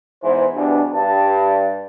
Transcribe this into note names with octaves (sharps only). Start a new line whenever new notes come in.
E2 G#2 E3 C5
E2 G2 B2 D4
G2 A5